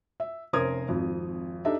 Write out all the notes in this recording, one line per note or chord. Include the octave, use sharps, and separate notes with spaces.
E5
F1 C#4 A#4 C5 D#6 G#6
G#1 F2
D4 D#4 G4 A4 D#5 E5